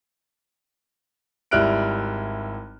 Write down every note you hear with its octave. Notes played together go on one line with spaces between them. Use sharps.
G#1 G3 E4 F6 F#6 D7